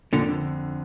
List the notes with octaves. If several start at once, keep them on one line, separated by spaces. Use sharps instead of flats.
F2 A#2 D3
D3